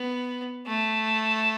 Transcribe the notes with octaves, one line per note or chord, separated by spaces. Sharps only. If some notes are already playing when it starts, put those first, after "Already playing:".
Already playing: B3
A3